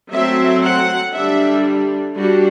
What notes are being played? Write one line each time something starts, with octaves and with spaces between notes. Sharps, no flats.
F#3 A3 C4 E5
F#5
D3 G3 D4 E5
G3 D4 F#4